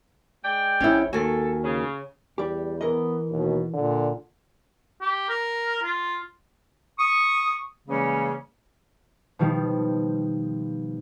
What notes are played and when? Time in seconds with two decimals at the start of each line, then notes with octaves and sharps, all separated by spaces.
0.45 G#3 D5 G5
0.81 A#1 C#4 E4
1.13 D#2 F#4 A4 G#5
1.64 C#3
2.38 E2 G3 G4
2.81 E3 B3 A#4 D#5
3.31 D#2 B2
3.73 A#2 D3
5.01 G4
5.29 A#4
5.83 F4
6.99 C#6 D#6
7.88 C#3 E3 G3 G#3 A#3 C#4
9.39 B2 D#3 F3 G3